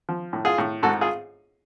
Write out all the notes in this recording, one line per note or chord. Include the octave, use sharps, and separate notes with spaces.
F3
A2
F4 G#4
A2
G#2 F#4 A4
F4 G#4